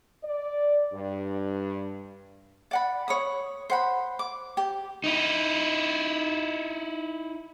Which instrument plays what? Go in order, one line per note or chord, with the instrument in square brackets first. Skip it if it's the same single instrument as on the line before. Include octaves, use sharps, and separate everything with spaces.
[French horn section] D5
G2
[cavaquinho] D5 F#5 B5
C#5 B5 D#6
C5 F#5 B5
D6
G4
[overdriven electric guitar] D#4 E4